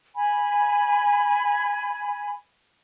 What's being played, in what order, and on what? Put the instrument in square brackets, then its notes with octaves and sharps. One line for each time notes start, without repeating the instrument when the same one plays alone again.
[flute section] G#5 B5